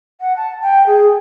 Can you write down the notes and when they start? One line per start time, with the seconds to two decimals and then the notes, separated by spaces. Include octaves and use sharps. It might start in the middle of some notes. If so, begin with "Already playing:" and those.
0.21 F#5
0.37 A5
0.62 G5
0.87 G#4